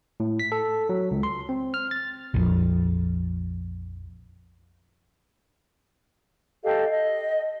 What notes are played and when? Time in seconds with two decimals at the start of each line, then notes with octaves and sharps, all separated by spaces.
0.20 A2
0.40 B6
0.52 A4
0.89 F#3
1.11 C#2
1.23 C6
1.49 C4
1.74 F6
1.91 A6
2.34 A#1 F2
6.64 G4 A4 D#5 F5
6.89 D#5